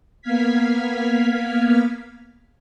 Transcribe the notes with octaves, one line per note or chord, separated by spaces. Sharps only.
A#3 B3 F5 F6 G#6 B6